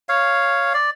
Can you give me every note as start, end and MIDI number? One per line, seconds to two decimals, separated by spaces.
0.09 0.73 73
0.09 0.73 77
0.74 0.90 74